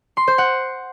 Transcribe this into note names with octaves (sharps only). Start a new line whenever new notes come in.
C6
C5
F#5